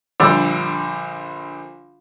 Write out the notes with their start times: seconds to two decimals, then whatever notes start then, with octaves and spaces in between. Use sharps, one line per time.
0.20 A#1 D3 G3 D5 E6